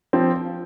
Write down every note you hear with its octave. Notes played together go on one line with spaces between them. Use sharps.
F3 C4